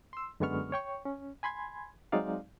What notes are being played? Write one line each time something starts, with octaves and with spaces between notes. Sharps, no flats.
C6 E6
F#2 D3 G#3 B3 C#6 F6
C#5 G5 C#6
C#4
G#5 B5 C6 G#6
F#3 G#3 C4 D#4 D5 F5